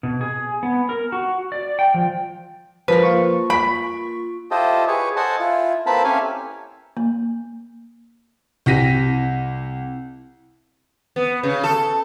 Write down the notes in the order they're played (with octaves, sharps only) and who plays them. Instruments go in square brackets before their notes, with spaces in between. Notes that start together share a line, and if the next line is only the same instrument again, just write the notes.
[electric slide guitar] B2
G#4
B3
A#4
F#4
D5
G5
F3
[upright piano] F3 [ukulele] A#4 B4
[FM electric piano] A#3 F4 C#6
[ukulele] B5 [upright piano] B6 D7
[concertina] E4 F4 G4 A4 C5 D#5
G#4 B4 C#5
A4 C5 D#5 F#5 G#5 A5
E4 F4
A#3 C4 A4 B4 A5 B5
C#4 E4 G4 A4 F5 G#5
[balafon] A#3
[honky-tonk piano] C2 G4 A#6 B6 D#7
[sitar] B3
C#3
A4